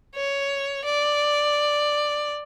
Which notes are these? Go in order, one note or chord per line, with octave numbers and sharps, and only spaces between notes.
C#5
D5